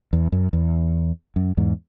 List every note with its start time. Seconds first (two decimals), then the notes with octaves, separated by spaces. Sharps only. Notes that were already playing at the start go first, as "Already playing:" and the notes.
0.13 E2
0.32 F#2
0.53 E2
1.36 F#2
1.57 E2 G#2